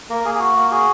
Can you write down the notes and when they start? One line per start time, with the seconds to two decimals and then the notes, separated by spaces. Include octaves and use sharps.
0.10 A#3 A#4
0.24 A#3 G#4
0.35 G#4
0.39 F#4
0.55 A#3
0.71 F#4 G#4